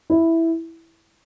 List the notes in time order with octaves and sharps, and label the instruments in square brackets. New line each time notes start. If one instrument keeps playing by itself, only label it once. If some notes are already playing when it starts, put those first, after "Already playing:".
[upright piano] E4